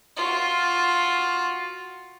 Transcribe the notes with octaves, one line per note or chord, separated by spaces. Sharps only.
F4 F#4